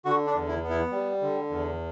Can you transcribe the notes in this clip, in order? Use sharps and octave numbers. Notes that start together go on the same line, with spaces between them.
D3 F#4
D4
E2
E4
B3
E4
G3
D3
E2